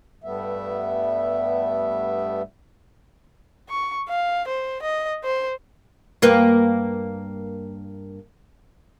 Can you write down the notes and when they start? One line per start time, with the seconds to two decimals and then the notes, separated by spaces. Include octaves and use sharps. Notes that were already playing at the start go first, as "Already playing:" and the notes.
0.24 G2 G3 A3 B3 E5
3.69 C#6
4.09 F5
4.48 C5
4.82 D#5
5.24 C5
6.22 G2 A#3 B4